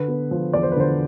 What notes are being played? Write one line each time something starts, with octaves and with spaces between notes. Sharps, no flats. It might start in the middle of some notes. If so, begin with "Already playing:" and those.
Already playing: D3 B4
B3
F3
E2 D5
C5
B4
D3 C5